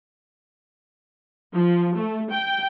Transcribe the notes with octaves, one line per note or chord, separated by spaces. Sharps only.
F3
A3
G5